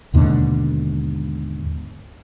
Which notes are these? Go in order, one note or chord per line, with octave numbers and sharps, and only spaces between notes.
D#2 G#2 B2 D3